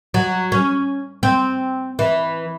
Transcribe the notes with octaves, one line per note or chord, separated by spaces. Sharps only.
F#3
C#4
C4
E3